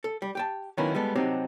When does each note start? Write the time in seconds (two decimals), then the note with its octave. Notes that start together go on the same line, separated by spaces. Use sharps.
0.04 A4
0.22 G3
0.35 G4 G5 A5
0.77 D#3 F#3 A#3 B3 C#4 E4
0.95 G3 G#3 B3 A4
1.16 C3 F#3 C4 D4 D#4 G4